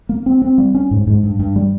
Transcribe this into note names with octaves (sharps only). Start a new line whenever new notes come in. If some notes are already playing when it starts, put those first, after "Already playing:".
A#3
C4
C4
G3
C#4
G#2
G#2
G2
G2
G3